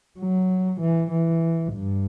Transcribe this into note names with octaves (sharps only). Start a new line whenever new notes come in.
F#3
E3
E3
G2